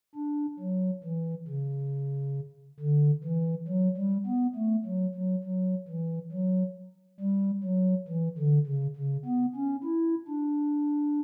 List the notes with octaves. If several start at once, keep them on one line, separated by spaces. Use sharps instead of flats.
D4
F#3
E3
C#3
D3
E3
F#3
G3
B3
A3
F#3
F#3
F#3
E3
F#3
G3
F#3
E3
D3
C#3
C#3
B3
C#4
E4
D4